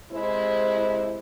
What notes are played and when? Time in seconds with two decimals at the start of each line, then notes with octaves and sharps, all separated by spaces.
0.12 C3 G#3 E4 C5